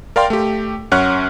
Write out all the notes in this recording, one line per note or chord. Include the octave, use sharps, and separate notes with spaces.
A#4 D5 F5 G5 C6
A3 G4
F#2 C#4 F#5 C#6 F6 F#6